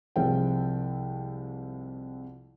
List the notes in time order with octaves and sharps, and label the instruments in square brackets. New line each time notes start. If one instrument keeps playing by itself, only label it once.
[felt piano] C2 C3 F3 G#3 G5